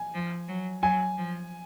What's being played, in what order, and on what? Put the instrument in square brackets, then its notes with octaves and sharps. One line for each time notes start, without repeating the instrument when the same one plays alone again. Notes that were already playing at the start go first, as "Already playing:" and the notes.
Already playing: [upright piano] G#5
[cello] F3
F#3
[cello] F#3 [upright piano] G#5
[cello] F3